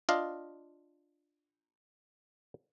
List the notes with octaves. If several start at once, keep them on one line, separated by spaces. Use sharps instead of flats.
D4 F4 D#5 F5